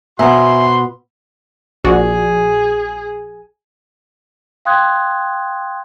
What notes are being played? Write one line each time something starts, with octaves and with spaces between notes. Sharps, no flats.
B2 B3 F#4 C5 E5 G#5 A#5 C6
A#1 F#4 G#4 D5
F5 G5 C6 D#6 F#6 G#6